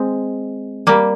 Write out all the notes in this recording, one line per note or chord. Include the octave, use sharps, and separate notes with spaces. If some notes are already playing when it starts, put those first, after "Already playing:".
Already playing: G#3 C4
G3 A#3